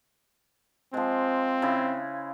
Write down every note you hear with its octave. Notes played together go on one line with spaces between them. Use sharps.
F3 G#3 C4
C#3 E4 G#4